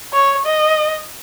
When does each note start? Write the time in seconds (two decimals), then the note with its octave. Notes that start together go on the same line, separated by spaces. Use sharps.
0.13 C#5
0.45 D#5